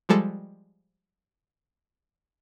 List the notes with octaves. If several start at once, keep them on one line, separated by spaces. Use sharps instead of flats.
F3 G3 G#3 A4